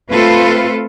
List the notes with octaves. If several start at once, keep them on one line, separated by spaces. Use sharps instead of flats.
A3 C4 F4 A4 B4